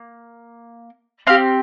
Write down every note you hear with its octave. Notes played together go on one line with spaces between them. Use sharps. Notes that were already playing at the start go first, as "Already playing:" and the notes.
Already playing: A#3
C4 G4 F5